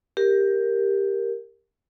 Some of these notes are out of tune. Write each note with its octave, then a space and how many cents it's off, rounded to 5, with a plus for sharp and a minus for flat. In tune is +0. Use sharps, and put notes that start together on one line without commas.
G4 +10 A#4 +0